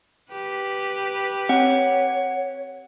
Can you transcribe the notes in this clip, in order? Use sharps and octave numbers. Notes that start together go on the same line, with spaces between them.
G4 B4
C4 C#5 F#5